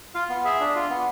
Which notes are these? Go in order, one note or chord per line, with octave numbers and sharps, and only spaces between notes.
F4 F5
B3
G#4 E5
D4
F4
B3